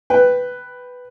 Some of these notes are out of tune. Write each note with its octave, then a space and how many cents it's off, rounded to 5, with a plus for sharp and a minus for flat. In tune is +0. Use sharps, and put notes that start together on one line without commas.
B4 +5 G5 +0